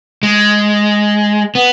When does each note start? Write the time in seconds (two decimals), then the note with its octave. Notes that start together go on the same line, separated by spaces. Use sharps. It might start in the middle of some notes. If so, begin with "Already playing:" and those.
0.23 G#3
1.55 B3